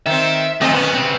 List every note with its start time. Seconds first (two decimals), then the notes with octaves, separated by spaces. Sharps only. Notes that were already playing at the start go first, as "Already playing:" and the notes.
0.06 D#3 C4 E5
0.61 F2 D#3 A3 C4 D#5
0.74 D#3 B3 C#4
0.94 C#3 C4